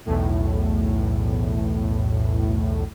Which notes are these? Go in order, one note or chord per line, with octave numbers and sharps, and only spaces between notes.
B1 E2 A2